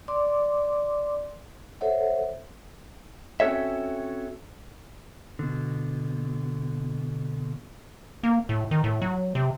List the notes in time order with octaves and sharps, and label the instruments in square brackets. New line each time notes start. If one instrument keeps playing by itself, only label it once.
[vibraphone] D5 C6 D6
A4 C5 C#5 E5 F#5
[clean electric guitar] C4 C#4 F#4 A4 C#5 E5
[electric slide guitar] B2 D3
[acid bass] A#3
A2
D#3
A2
F#3
C3